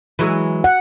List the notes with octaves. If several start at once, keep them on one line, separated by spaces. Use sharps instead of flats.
E3 F#3 G#3
F#5